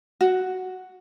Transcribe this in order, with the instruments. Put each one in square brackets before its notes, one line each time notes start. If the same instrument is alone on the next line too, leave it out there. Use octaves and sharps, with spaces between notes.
[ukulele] F#4